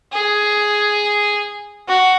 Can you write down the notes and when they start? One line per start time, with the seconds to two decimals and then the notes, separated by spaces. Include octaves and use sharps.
0.12 G#4
1.88 F#4